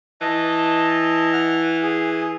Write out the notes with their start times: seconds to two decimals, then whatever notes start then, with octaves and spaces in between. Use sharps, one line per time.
0.21 E3 D#5 A5
1.33 F#5 F6
1.83 G#4